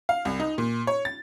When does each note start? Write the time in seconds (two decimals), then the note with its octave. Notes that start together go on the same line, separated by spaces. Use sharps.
0.09 F5
0.25 C2
0.40 D#4
0.58 A#2
0.87 C#5
1.05 A6